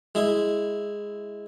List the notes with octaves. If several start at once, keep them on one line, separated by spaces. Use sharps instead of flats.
G#3 E4